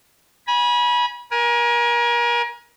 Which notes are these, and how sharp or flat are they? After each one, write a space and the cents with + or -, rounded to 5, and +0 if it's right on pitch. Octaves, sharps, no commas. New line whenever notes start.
G#5 +0 B5 -30
A#4 +35 G#5 +0